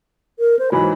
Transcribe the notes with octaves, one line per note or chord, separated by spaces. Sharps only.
A#4
C5
G#2 E3 F#3 B5